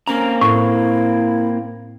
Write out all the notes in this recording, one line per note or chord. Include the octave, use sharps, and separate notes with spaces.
A#3 C4 C#4 A#5
A2 E4